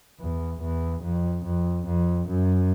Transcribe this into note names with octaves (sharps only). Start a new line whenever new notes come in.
E2
E2
F2
F2
F2
F#2